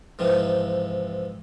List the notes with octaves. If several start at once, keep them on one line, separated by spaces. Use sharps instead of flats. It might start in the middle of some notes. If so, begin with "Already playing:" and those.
G#2 C3 E3 F3